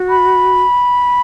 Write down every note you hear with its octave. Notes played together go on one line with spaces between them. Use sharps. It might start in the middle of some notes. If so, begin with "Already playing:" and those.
Already playing: F#4
B5